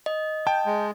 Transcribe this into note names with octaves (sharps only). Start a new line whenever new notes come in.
D#5
G5 A5 G6
G#3